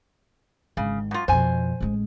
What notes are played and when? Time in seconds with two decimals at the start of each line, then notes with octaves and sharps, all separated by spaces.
0.77 G#1 C#3
1.11 F#2 F4
1.28 F2 B2 C5 G#5
1.80 A1 G#3